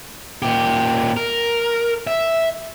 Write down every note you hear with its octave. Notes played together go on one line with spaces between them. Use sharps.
A#2 G4
A#4
E5